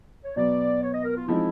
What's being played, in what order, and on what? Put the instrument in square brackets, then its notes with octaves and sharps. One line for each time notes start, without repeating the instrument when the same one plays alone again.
[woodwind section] C#5
[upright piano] B2 F#3 B3 [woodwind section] D5
[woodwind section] C#5
D#5
A#4
F4
[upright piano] F3 G#3 C4 D#4 [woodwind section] E4